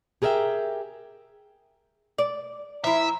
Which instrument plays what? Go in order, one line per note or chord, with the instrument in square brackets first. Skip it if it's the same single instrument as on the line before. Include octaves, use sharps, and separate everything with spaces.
[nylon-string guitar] G4 G#4 A#4 D5 E5 G5
[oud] D5
[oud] F3 E4 [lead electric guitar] E5 [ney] A#5